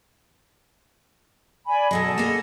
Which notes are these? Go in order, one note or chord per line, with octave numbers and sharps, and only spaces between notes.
D5 G#5 B5
B2 F#3 G#3 A4 D#5
A#3 G#4